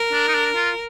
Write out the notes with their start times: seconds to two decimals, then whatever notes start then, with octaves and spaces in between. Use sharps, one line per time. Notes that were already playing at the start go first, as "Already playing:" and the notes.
Already playing: A#4
0.13 D4
0.28 D#4
0.34 D4
0.56 F4